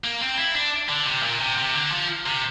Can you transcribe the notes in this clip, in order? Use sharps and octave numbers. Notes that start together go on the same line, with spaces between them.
A#3
C4
E4
D4
D3
C3
A#2
C3
C3
D3
F3
C3